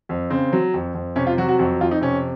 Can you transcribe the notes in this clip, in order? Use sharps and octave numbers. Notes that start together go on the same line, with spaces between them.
F2
C#3 C4
F#3
F2
F2
C3 C#4
F4
F#3 F#4
F#4
F2 F#4
F2 F4
D#4
C3 C#4